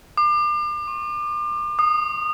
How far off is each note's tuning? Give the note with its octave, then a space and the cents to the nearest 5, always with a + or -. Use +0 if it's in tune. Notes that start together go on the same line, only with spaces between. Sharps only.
D6 +35
C#6 -40
D#6 -25